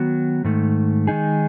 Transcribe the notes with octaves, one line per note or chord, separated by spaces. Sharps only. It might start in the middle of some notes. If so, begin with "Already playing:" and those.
Already playing: D#3 F#3 B3 F#4
G#2 D#3 A3
D#3 G#3 D#4 G#4